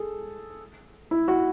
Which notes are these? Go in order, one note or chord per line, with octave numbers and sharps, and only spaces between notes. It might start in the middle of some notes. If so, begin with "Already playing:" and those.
Already playing: G#4 A4
E4
F#4